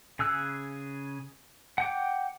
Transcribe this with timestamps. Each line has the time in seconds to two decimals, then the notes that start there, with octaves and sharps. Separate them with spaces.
0.19 C#3 G#4 E6 F#6
1.78 F#5 G5 D6